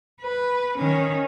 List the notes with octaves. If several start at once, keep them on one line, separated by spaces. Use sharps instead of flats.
B4
D#3 C#4